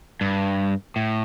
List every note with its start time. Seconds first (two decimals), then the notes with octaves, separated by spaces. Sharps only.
0.21 G2
0.96 A2